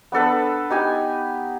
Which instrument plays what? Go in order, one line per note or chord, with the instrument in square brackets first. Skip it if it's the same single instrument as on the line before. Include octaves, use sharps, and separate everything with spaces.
[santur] B3 D4 A4 B4
D#4 G4 G#5 B5